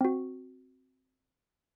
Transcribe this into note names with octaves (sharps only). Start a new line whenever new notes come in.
C4 F#4